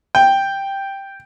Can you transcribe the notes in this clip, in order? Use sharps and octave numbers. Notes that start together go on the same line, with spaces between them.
G5